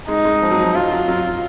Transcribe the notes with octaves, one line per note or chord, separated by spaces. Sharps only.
G#3 D#4
G#3
F3
F#3
F3
F#3 F4
F#3
F#3
F#3